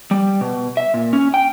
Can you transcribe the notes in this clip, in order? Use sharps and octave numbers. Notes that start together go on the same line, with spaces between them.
G3
B2
E5
A#2
C#4
G5